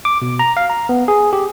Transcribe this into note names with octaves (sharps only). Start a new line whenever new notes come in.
D6
B2
A#5
F5
A#5
B3
G#4
G4